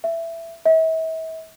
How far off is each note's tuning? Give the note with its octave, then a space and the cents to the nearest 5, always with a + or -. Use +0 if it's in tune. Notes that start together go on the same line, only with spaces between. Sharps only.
E5 +15
E5 -40